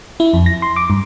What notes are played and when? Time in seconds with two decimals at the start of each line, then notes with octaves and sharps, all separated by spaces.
0.20 E4
0.34 F2
0.46 A#6
0.62 C6
0.76 D6
0.90 G2